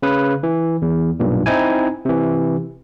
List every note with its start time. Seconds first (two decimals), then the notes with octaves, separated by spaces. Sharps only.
0.03 C#3 B4
0.43 E3
0.82 E2
1.20 B1 G2 A#2
1.46 C4 D#4 E4 G#5
2.05 C3 E3